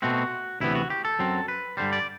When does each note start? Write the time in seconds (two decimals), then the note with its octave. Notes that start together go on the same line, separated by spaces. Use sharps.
0.02 B2 A3 C4 F#4
0.60 D2 C3 E3 B3 E4
0.75 F#4
0.90 G4
1.05 A4
1.19 F#2 F#3 C4
1.48 B4
1.77 G2 D3 G3 C5
1.93 D5